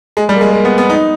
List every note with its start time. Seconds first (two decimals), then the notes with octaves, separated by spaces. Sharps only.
0.17 G#3
0.29 G3
0.36 A#3
0.41 G#3
0.53 A#3
0.65 B3
0.78 B3
0.90 D#4